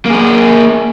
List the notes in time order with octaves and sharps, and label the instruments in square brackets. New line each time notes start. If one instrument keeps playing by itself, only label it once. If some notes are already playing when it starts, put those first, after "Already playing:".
[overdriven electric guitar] A#3 G#4